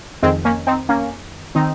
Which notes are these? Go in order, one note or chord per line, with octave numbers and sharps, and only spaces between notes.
F2 D#3 G#3 C4
A#3 C#4
C4 D#4
A#3 C#4
D#3 C4 D#4